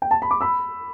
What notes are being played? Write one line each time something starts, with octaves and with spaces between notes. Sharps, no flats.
G5
A5
B5
D6
B5 E6